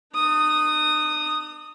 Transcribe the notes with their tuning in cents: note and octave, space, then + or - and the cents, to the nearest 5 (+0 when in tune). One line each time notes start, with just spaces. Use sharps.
D4 +45 D#6 -5